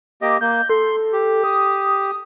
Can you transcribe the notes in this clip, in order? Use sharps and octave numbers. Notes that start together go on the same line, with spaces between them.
A#3 G4 D#5 D6
A#3 G6
A4 C6
G4
D#6